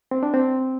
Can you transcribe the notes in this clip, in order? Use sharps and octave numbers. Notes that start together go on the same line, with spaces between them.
C4
D4
C4